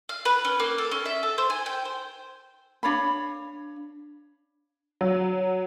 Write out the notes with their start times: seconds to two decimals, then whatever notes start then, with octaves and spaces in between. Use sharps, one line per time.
0.09 F5
0.25 B4
0.45 C#4
0.60 A#3
0.78 A4
0.92 C#4
1.06 E5
1.23 A4
1.38 C5
1.50 G#5
1.66 G5
1.85 C5
2.83 D4 C#5 F5 B5
5.01 F#3